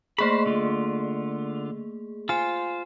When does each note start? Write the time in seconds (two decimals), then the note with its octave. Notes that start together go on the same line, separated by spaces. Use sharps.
0.18 A3 A#3 G#4 C5 B5
0.46 D3 F4
2.29 F4 C5 G#5